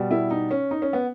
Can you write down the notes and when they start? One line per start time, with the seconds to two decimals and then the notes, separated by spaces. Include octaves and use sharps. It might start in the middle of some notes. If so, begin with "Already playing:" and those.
Already playing: B2 G3
0.11 E4
0.31 D#4
0.51 C#4
0.71 D#4
0.82 C#4
0.93 B3